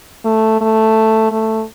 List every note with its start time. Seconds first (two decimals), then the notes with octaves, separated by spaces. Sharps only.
0.25 A3
0.61 A3
1.32 A3